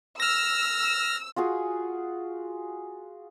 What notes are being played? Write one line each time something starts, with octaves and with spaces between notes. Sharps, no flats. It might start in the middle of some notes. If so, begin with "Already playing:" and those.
E6 F6 A#6
F4 F#4 G#4 G#5